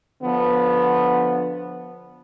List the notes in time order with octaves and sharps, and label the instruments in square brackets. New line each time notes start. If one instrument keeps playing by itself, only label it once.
[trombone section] D3 F3 B3